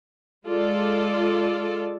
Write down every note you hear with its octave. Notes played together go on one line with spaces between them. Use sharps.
G#3 F4 A4 D5